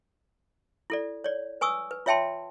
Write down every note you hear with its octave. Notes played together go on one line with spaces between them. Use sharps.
E4 A4 D5
C#5 D5
B4 G#5 C#6 D#6 E6
B4
F4 C#5 E5 G5 A5 C6